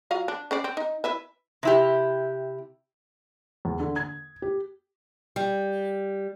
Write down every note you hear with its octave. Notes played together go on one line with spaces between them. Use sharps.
F#3 F4 F5
D4
C#4 C5 D5
C4
D#4
E4 B4 E5
C3 E4 G4
E2
D3
G#6
G4
G3